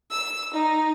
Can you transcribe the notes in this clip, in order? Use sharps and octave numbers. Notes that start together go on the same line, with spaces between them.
E6
D#4